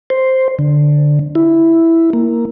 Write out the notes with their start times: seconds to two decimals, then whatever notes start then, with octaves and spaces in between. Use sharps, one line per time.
0.10 C5
0.59 D3
1.35 E4
2.13 A#3